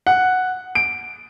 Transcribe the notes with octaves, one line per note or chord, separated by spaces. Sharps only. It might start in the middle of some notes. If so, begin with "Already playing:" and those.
F#5
D7